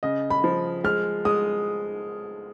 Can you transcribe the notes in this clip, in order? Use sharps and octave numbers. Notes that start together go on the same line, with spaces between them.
C#3 D#5
B5
F3
G#3 F6
G#3 D#6